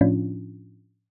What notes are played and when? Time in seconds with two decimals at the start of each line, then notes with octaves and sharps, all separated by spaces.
0.01 A2 F3 C#4 D4 F4